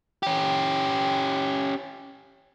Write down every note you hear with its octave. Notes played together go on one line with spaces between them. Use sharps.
C#4 G4